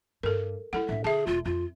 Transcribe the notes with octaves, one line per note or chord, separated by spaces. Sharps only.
G2 A4 A#4
G3 E4 A4 F#5
A2 D4 E5
D3 G#4 E5 A5
E1 F4
F2 F4